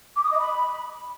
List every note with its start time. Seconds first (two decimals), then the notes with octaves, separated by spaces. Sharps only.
0.16 D6
0.24 D#6
0.31 D#5
0.39 B5